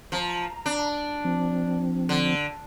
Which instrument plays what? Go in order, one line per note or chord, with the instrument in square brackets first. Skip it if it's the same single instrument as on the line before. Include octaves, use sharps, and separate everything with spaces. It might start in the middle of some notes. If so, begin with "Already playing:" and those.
[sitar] F3 [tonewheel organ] A#5
[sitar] D4
[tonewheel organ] F3 C4
[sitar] D3